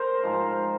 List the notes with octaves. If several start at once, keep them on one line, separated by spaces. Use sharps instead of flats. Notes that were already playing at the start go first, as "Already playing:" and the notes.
Already playing: A#4 C5
G#2 F3